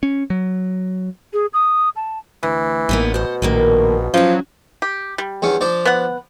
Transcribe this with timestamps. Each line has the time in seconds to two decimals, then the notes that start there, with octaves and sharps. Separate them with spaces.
0.03 C#4
0.30 F#3
1.33 G#4
1.53 D#6
1.96 A5
2.43 D2 E3
2.89 A1 A#3 B3 D#4
3.14 B2 C5 F#5
3.42 A#1 A2 D#3 A#3
4.14 F3 F#3 C#4 F#4
4.82 G4
5.18 G3
5.42 E2 C#4 D4
5.61 F3 D4 D5
5.85 B3 F#5